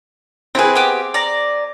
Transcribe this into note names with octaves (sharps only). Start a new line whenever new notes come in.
C4 E4 G#4 B4
B3 G4
D5 A#5